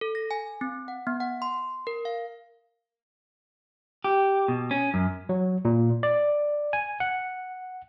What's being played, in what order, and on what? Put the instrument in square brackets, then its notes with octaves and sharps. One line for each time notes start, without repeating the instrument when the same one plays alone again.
[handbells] A4
A#6
G#5
C4
F#5
B3
F#5
C6
A#4
F5
[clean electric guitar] G4
B2
C#4
F#2
[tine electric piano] F#3
A#2
D5
G#5
F#5